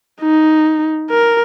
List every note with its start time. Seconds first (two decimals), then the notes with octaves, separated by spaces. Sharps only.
0.21 D#4
1.11 A#4